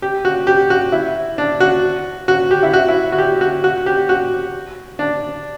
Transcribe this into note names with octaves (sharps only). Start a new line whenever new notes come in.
G4
F#4
G4
F#4
E4
D4
F#4
F#4
G4
E4
F#4
E4
F#4
G4
F#4
F#4
G4
F#4
D4